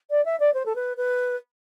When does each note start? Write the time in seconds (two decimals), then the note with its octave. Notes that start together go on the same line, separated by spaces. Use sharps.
0.10 D5
0.25 E5
0.40 D5
0.54 C5
0.65 A4
0.75 B4
0.97 B4